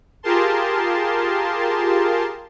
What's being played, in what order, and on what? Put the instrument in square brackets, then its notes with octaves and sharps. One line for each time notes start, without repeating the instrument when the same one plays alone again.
[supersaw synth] F4 G4 G#4 A#4 A5 C6